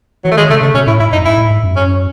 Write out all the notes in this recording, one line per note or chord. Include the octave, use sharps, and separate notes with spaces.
E3 F#3
A3
D#3 G#3
C#3 A3
C#3 A3
B2 C#4
A2 E4
G#2 E4
F#2 D#4
G#2 E4
A2
G#2
F#2
C#4